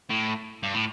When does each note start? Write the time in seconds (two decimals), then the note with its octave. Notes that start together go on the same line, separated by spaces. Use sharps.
0.10 A2
0.63 G2
0.74 A2